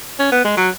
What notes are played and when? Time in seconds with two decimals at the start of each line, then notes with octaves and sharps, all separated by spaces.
0.19 C#4
0.32 B3
0.45 G#3
0.57 F#3